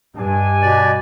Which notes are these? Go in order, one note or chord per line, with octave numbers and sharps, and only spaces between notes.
G2 D4 D#5 G#5
B2 D5